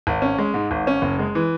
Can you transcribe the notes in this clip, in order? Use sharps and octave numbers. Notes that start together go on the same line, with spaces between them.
G#1
C#4
G#3
G#2
G#1
C#4
F#1
G#3
E3